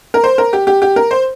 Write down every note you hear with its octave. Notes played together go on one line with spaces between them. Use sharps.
A#4
C5
A#4
G4
G4
G4
A#4
C5